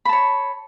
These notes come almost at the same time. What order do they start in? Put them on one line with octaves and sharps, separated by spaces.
B5 A5 C#5